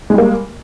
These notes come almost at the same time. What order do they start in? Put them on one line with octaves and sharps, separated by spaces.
G#3 G3 A#3